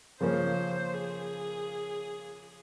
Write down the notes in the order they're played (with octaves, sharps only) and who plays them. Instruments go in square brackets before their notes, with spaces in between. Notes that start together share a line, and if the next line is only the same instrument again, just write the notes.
[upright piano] C#3 F3 A#3 C#4 [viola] C5
[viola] G#4